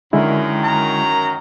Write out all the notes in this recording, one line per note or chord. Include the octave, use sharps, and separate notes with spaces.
F#2 D3 D#3 G#3 E4
A#5